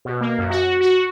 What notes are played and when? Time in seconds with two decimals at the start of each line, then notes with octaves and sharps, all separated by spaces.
0.05 B2
0.21 A#3
0.38 F#2
0.50 F#4
0.81 F#4